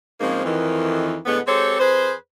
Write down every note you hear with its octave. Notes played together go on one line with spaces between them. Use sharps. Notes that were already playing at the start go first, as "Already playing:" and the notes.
G#2 C#3 F3 G#3 A#3 C4
F2 D#3 E3
A2 D3 G#3 B3
G#3 C4 G4 A4 C5 C#5
F2 G#4 B4 C5